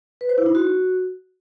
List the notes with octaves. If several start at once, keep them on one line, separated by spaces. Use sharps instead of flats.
B4
C5
E4
D#4
F#4